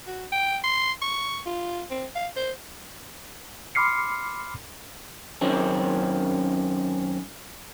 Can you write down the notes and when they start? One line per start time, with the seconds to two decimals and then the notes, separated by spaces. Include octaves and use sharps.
0.07 F#4
0.32 G5
0.64 C6
1.02 C#6
1.46 F4
1.91 C4
2.16 F5
2.36 C5
3.75 B5 C6 D6 F6 C7 C#7
5.41 F#2 D#3 C4 C#4